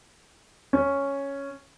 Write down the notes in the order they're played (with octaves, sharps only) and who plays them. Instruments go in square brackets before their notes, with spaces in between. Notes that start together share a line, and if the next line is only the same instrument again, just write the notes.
[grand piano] C#4